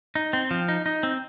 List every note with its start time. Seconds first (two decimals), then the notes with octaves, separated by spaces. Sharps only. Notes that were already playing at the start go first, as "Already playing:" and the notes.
0.15 D#4
0.33 C4
0.51 F3
0.68 D#4
0.86 D#4
1.03 C4